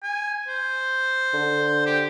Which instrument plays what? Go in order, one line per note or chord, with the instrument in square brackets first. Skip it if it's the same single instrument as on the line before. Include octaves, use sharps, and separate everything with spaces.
[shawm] G#5
C5
[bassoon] D3
[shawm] G4